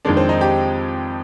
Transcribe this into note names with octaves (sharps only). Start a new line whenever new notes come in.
F2 D#3 G#3 D4
C4
D#4
G4